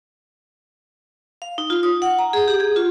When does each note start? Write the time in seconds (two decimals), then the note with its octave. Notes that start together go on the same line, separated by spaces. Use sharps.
1.42 F5
1.58 D#4
1.70 F4
1.83 D#6
2.02 F#5
2.19 A#5
2.33 G#4
2.48 G4
2.60 G#4
2.76 F4